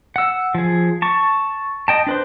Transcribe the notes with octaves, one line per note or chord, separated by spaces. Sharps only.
F#5 E6
F3 G#4
A5 C#6
D#5 G5 A5
D4 B4 C5